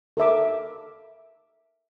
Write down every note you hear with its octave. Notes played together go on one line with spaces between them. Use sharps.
A4 A#4 E5 D6